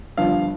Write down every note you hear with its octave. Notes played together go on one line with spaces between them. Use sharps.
G1 G2 F3 F5